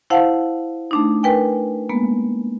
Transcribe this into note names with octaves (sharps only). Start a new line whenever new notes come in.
E4 C5 F5 F#5 A5
A3 D4 D#4
A#4 B4 G5 G#5
G#3 A#3 B3